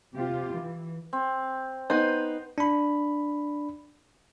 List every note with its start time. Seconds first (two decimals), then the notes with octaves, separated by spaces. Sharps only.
0.16 C3 F4 G4
0.53 E3
1.13 C4
1.90 B3 D#4 C5
2.58 D4 B5